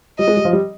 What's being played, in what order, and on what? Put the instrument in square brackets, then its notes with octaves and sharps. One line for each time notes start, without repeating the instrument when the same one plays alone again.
[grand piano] G3 [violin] D#5
[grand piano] G#3
G3
F3
G3